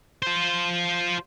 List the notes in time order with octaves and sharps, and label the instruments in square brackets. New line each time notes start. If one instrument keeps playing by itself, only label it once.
[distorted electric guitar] F4 C5